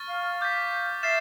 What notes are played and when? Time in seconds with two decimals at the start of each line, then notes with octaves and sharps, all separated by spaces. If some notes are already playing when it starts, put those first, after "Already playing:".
Already playing: C#6 F6 A6
0.09 F5
0.41 D6 G6 B6
1.03 E5 F6 A6 C7 E7